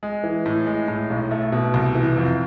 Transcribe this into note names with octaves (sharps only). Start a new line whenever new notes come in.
G#3
E3
A2
G#3
A2
B1
A3
B2
C2
E3
F2